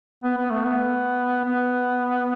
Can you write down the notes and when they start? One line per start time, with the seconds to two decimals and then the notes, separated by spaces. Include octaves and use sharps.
0.24 B3
0.37 B3
0.51 A3
0.64 B3
1.45 B3